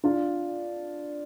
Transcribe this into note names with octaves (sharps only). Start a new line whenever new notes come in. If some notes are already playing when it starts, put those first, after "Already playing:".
D4 F4